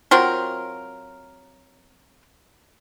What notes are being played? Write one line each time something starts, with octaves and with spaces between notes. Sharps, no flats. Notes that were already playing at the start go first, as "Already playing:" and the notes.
F#3 C4 F4 A#4